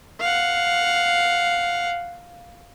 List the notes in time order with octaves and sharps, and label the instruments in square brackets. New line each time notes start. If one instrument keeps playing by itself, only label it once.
[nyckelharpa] F5 F#5